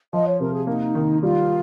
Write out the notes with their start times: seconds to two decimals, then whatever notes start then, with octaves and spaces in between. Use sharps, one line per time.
0.12 F3 D#5
0.26 C#5
0.40 C3 A#4
0.53 G#4
0.67 A#3 D#4
0.95 D#3
1.23 G3 F4